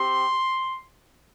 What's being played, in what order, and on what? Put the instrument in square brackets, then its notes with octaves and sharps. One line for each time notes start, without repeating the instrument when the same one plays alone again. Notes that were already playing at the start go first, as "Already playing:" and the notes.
Already playing: [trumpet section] C4 G4 C6